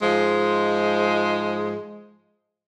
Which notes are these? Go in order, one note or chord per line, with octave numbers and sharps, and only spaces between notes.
G#2 F3 G#3